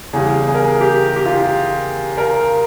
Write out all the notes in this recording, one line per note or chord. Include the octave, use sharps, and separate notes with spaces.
E2 C#3 G3 G#4
G#4
A#4
G#4
G4
G4
F4
G4
A#4